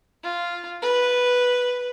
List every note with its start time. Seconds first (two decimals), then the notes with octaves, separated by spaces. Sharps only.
0.23 F4
0.82 B4